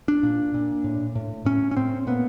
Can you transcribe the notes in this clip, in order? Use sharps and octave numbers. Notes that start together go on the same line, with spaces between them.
D4
A#2
A#2
A2
A2
A2 C#4
C#4
A2 C4
A#2 B3